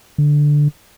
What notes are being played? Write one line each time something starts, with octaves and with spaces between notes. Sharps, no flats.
D3